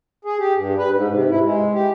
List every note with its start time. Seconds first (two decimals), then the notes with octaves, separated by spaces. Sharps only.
0.25 G#4
0.39 G4
0.56 G2
0.78 B4
0.93 G#2
1.12 C3
1.29 E4
1.43 G#3
1.73 G4